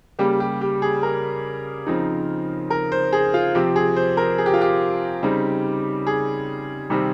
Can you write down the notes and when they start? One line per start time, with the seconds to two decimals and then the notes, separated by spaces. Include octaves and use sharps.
0.19 C#3 G3 A#3 G4
0.40 G4
0.61 G4
0.82 G#4
1.03 A#4
1.86 C#3 F3 C4 D#4
2.70 A#4
2.92 C5
3.13 G#4
3.34 F4
3.55 C3 F3 C4 G4
3.76 G#4
3.96 C5
4.17 A#4
4.38 G#4
4.46 G4
4.54 F4
4.61 G4
5.23 C#3 G3 C4 D#4
6.07 G#4
6.90 C3 D#3 G3 C4